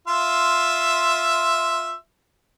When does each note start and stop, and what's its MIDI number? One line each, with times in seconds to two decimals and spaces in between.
0.08 1.92 65
0.08 1.92 76
0.08 1.92 84